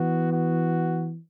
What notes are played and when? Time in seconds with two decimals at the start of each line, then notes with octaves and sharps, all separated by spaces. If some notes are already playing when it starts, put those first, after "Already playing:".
Already playing: E3 B3 F#4
0.32 F#4